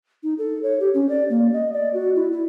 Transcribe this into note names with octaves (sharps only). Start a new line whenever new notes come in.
D#4
A4
C#5
G4
C#4
D5
A#3
D#5
D5
F#4
E4
E4